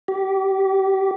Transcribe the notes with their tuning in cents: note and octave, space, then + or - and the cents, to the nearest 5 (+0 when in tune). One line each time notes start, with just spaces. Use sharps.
G4 -25